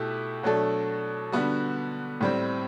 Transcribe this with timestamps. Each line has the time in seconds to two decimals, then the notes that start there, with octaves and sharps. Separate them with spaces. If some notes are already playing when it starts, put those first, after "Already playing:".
Already playing: B2 A3 E4 G4
0.43 B2 F#3 A3 D4 A4
1.32 D3 G3 B3 F#4
2.21 A2 G3 C4